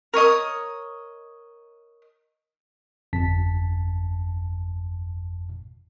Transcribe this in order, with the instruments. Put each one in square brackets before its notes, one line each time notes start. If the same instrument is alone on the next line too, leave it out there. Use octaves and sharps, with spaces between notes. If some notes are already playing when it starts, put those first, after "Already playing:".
[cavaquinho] A#4 C#5 D#5 D#6
[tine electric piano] G1 F2 A5 B6